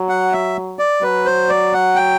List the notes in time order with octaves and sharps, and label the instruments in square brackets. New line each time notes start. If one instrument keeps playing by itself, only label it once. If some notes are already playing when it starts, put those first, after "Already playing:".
Already playing: [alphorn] F#3
[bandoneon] F#5
E5
D5
[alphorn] F#3 [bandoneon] B4
[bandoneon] C5
D5
F#5
G5